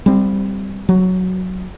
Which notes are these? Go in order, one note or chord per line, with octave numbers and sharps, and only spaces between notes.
G3 C4
F#3